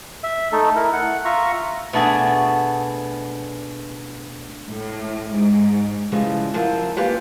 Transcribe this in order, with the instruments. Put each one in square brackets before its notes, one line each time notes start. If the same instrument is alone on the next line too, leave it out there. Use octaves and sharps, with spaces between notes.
[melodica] E5
A3 D#4 A4
E4 A#4
F#5
F4 E5 A#5 C#6
[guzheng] B2 A3 D4 F#4 G#4
[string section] A2
G#2
[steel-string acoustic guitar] C#3 E3 F3 G3 G#3
F#2 F3 C4 E4 F4 A#4
A#3 C#4 F4 G4 B4